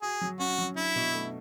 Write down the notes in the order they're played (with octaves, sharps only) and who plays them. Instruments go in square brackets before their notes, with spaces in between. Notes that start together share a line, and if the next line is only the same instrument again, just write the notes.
[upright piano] F#4 [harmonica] G#4
[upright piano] F#3
[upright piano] C#4 [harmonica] F#4
[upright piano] F#3
[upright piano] D4 [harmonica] E4
[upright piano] B2
A3